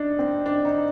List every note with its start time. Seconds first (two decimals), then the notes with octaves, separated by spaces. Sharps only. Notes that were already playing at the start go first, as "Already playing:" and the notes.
Already playing: D4 D#4
0.19 C4
0.46 D4
0.65 D#4